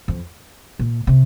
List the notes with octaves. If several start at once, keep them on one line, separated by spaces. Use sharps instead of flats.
F2
A#2
C3